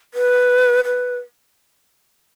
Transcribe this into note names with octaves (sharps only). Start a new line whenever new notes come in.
B4
B4